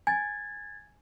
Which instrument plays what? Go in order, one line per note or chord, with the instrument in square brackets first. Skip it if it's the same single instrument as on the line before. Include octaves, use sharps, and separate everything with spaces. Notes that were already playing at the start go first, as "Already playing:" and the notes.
[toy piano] G#5 [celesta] G#6 A6